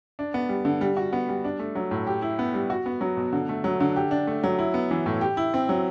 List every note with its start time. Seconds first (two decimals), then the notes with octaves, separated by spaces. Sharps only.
0.19 D4
0.34 B3
0.49 G3
0.65 D3
0.81 G3
0.97 F#4
1.13 B3
1.29 G3
1.44 D4
1.59 A3
1.75 F#3
1.91 A2
2.07 G4
2.22 E4
2.39 B3
2.54 G3
2.70 F#4
2.86 B3
3.01 F#3
3.17 B2
3.33 D3
3.49 A3
3.64 F#3
3.80 D3
3.96 G4
4.11 D4
4.27 A3
4.44 F#3
4.58 E4
4.74 B3
4.91 E3
5.06 A2
5.21 G4
5.37 E4
5.54 C4
5.69 F#3